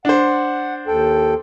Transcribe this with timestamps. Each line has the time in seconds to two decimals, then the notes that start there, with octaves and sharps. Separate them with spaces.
0.05 D4 C5 F#5
0.87 D#2 A4 G5